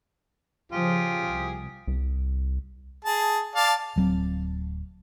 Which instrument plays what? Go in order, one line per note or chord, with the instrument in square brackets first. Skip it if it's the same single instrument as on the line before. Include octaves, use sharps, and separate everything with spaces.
[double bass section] C#3 F3 [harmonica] F4 G4 G#4
[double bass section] C2
[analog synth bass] C2
[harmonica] G#4 A5
D5 F5 A5
[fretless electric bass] D1 F#3 C4